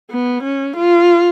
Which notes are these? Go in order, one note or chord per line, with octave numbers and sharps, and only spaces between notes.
B3
C#4
F4